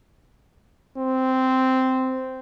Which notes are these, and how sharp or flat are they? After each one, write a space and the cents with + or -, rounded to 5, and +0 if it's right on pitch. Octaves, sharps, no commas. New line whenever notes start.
C4 -10